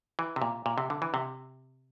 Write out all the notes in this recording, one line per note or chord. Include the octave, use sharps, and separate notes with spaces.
E3
C3
A#2
A#2
C3
D3
E3
C3